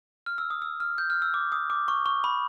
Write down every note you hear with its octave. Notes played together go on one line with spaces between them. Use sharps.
F6
E6
D#6
E6
F6
G6
F6
E6
D6
D#6
D6
C#6
C#6
B5